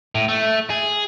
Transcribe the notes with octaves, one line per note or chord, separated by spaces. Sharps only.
A2
A3
G#4